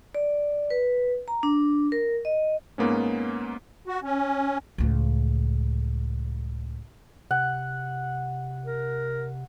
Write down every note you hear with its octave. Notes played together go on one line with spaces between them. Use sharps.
D5
B4
A#5
D4
A#4
D#5
G#2 A#3 B3 C#4
F#4
C#4
C#2 A2
C3 F#5
A#4